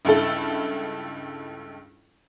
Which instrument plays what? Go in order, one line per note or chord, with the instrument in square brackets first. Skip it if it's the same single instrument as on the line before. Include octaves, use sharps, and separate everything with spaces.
[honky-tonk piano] C#2 G2 E4 A4